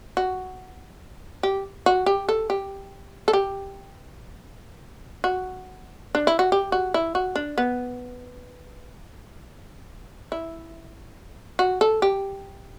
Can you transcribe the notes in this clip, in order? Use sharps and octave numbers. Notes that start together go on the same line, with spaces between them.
F#4
G4
F#4
G4
A4
G4
A4
G4
F#4
D4
E4
F#4
G4
F#4
E4
F#4
D4
B3
E4
F#4
A4
G4